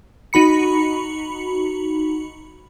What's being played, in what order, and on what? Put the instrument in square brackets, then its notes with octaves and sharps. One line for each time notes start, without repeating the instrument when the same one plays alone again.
[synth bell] D#4 F#4 B5 C#7